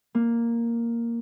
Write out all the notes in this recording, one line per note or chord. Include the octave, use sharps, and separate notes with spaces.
A#3